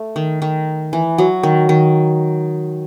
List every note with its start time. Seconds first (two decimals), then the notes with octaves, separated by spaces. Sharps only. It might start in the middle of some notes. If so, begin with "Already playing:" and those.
Already playing: A3
0.16 D#3
0.42 D#3
0.93 E3
1.18 F#3
1.43 D#3
1.69 D#3